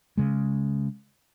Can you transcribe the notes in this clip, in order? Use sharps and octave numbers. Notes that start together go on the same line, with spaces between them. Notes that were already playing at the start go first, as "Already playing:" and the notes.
C#3 G#3